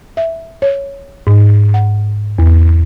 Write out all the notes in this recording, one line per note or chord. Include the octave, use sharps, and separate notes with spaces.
E5
C#5
G#2
F#5
E2